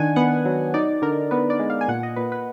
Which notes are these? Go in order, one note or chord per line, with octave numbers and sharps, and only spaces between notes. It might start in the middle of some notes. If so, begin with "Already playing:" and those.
Already playing: D#3 D4 F#5 G#5
B3 F#5
F#3
D#4 D5
D3 A#4
B3 B4
D5
G#3
F5
G#5
A#2 F#5
D#5
A#2 B4
B4